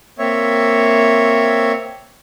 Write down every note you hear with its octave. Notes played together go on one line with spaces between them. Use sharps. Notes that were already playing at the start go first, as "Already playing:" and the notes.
A#3 C4 C#5 E5